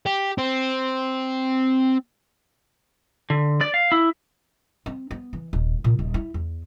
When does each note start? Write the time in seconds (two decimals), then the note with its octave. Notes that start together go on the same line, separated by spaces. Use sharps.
0.06 G4
0.38 C4
3.30 D3
3.61 D5
3.74 F5
3.92 E4
4.86 C4
5.11 B3
5.33 E3
5.53 D#1
5.84 A#2
5.99 D#1
6.14 E4
6.34 E2